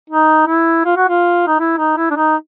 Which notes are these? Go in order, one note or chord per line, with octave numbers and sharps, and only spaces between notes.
D#4
E4
F4
F#4
F4
D#4
E4
D#4
E4
D4
D#4